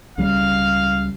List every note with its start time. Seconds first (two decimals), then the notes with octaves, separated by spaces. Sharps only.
0.18 C#2 C#3 G3 F5